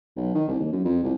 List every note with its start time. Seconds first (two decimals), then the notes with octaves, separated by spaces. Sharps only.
0.17 B1
0.35 D#3
0.48 C2
0.59 D#2
0.72 F#2
0.85 F2
1.03 C2